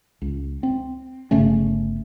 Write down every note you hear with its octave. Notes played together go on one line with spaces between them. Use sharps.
C#2
C4
G1 C#3 A3 C#4